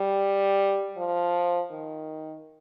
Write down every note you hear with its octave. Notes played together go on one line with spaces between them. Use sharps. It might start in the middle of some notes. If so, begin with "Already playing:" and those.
Already playing: G3
F3
D#3